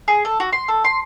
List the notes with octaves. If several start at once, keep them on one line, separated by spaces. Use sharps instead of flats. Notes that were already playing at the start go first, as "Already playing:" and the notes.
G#4
A4
F#4
C6
A4
C6